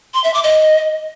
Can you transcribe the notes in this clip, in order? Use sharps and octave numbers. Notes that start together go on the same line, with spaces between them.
C6
E5
D6
D#5